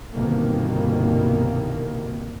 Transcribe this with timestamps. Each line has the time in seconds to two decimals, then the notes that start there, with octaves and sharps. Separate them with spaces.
0.13 G1 C2 B2 D#3 A#3